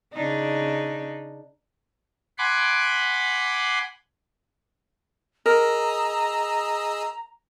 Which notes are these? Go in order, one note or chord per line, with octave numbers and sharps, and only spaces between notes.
C#3 D4 D#4
F#5 G#5 B5 C6 D6
G#4 A#4 D#5 A#5 E6